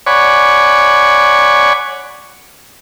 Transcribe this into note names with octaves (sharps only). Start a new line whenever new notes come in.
C#5 D5 F#5 G#5 B5 C#6